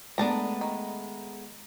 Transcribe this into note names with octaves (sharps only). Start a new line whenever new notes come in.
G#3 A3 B3 D4 A5 A#5
D#3